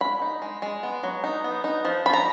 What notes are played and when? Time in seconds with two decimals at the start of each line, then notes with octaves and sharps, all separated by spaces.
0.01 G#3 B5
0.22 D#4
0.42 G#3
0.62 G#3
0.83 B3
1.03 F#3
1.24 D#4
1.44 B3
1.64 D#4
1.85 F3
2.06 F3 B5
2.13 A#5